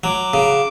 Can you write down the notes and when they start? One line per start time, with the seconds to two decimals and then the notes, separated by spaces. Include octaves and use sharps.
0.04 F#3 D6
0.34 C#3